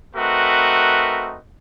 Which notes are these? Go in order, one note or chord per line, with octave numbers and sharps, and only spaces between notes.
A3 C4 D#4 F#4 A#4 B4